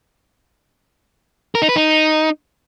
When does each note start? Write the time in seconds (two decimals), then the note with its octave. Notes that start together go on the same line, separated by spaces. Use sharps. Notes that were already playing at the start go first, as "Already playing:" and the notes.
1.55 A#4
1.62 D#4
1.69 B4
1.76 D#4